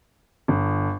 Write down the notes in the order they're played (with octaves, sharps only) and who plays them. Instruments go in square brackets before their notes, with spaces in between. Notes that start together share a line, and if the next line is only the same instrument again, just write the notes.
[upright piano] G1